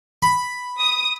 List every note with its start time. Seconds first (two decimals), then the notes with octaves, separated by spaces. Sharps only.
0.23 B5
0.80 D#6